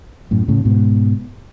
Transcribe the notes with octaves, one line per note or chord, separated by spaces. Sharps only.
F#2 A2
A2 C#3
G#2 B2